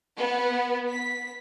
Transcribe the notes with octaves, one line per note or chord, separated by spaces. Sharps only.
B3
B6